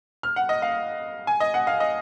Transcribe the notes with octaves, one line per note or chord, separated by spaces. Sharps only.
F6
F#5
D#5
F5
G#5
D#5
F#5
F5
D#5